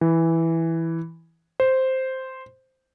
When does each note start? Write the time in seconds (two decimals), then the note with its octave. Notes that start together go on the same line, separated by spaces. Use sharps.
0.01 E3
1.60 C5